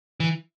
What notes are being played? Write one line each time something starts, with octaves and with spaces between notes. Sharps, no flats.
E3